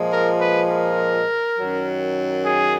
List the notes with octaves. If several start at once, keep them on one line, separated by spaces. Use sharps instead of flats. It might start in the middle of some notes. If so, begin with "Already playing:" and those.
Already playing: A#2 F3 G#3
A#4
B4
A#4
F#2 D#3 F#3
G#4